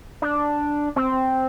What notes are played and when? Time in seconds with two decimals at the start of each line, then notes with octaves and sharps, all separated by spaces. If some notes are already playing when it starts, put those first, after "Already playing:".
0.22 D4
0.96 C4